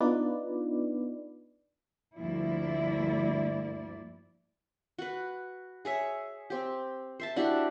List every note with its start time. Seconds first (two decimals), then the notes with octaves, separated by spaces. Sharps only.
0.01 B3 D4 D#4 F4 B4 D5
2.19 D2 G2 F3 A#3 E4 D5
4.98 F#4 B4
5.85 G#4 C#5 E5
6.50 C4 G4
7.20 C5 E5 A5
7.36 D4 E4 F#4 G4